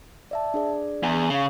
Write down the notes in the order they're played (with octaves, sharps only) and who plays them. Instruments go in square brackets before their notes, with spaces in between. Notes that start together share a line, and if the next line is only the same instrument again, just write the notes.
[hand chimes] D5 E5 A5
D4 G#4 D5
[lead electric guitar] E2
[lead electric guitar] C#3 [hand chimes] G#4 F5